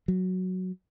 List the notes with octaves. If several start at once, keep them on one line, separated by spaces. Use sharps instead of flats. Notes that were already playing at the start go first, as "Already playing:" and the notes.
F#3